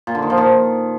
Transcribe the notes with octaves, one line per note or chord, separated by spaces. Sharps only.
A#2
D3
D#3
F3
D#3